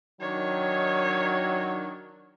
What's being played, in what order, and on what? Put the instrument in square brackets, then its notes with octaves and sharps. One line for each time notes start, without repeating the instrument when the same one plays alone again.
[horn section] D#3 D4 D#4 [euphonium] F#3 [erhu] C#5